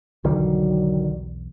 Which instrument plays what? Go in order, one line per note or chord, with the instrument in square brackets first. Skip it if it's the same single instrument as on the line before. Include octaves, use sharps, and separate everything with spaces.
[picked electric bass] B1 E2 [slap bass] D3 D#3 G3 [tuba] F#3